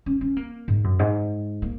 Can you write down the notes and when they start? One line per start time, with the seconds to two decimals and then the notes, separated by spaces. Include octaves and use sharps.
0.06 C#4
0.21 C#4
0.36 A#3
0.68 G#2
0.84 F#2
0.99 G#2
1.62 A#3